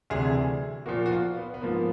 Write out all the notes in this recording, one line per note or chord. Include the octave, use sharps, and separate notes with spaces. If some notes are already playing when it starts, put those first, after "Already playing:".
D2 C3 E3 G3 G#4
A#2 F3 A#3 F#4
F#4
F4
B3
B3
G#2 F3 A#3